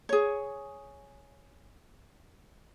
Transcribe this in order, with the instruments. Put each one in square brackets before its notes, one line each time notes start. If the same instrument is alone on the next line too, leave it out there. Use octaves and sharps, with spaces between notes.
[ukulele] G#4 C#5